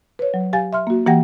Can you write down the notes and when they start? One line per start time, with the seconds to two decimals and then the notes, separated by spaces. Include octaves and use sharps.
0.19 B4 C#5
0.34 F#3
0.53 G4 F5 G#5 A6
0.73 E5 C6 F6
0.87 A#3 F#4
1.06 E3 A#3 G4 F#5 G5 A#6